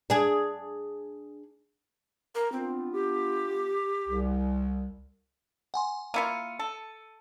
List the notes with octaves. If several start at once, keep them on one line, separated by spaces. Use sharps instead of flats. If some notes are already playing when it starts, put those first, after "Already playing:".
D4 G#4
A#4
B3 C4 D4 F4
G4
C2
F#5 G#5 C6
A#3 E4 F4 C#7 D#7
A4